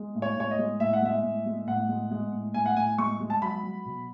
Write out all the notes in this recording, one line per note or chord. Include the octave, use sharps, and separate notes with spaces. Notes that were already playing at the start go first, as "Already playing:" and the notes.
Already playing: G#3
A2
C#5
A2 C#5
D#5
G#3
A2 E5
F#5
G#3 E5
A2
G#3
A2 F#5
G#3
G#3
A2
A2 G#5
F#5
A2 G#5
G#3 C#6
G#3
A5
F#3 B5
F#3
B2